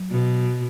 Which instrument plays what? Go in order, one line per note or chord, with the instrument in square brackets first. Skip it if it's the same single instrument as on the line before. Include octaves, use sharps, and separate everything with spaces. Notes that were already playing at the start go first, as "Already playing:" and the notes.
Already playing: [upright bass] F#3
[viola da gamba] B2